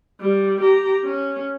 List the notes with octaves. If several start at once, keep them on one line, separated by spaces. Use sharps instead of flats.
G3
G4 A#5
C#4